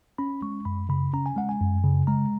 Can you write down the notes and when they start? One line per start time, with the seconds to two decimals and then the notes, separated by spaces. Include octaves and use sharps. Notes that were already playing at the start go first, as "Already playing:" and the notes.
0.18 C#4 B5
0.42 G#3 C#6
0.65 F#2 B5
0.89 C#3 B5
1.13 C#4 A#5
1.26 G#5
1.36 G#3 F#5
1.49 G#5
1.61 F#2
1.84 C#3
2.07 G#3 A#5